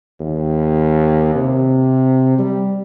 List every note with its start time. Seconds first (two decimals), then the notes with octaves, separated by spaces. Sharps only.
0.20 D#2
1.35 C3
2.38 G3